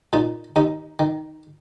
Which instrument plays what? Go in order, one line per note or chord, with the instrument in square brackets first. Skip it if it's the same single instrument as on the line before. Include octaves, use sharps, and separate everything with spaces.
[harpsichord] A#2 D#4
D#2 D#4
D#3